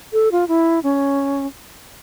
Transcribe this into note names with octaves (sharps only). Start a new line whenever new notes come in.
A4
F4
E4
C#4